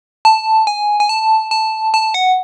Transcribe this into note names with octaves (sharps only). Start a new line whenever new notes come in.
A5
G#5
G#5
A5
A5
A5
F#5